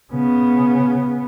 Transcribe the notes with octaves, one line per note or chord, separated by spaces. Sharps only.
C#3 B3